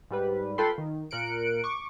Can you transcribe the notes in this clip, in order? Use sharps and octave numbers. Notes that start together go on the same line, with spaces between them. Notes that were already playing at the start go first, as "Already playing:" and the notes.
G#2 G3 B4
F4 A4 B4 G5 B5 C6
D#3
A#2 A#4 F#6 C#7 D7
C#6 D6